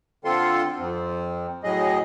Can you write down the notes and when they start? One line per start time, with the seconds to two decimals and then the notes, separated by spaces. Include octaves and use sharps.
0.25 D3 C4 F4 A4 C6
0.79 F2 C4
1.64 A2 F#3 G#4 D#5